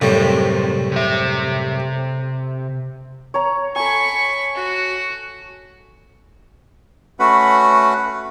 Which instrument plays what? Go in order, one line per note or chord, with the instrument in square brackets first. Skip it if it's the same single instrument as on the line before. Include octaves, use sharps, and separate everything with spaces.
[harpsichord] F#2 A2 G3 [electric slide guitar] C3
[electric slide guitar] C3 E5
[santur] C#5 A#5
[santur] A4 G#5 [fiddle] B5 C#6
[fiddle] F#4
[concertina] A3 C#4 F#4 B4 F#5 B5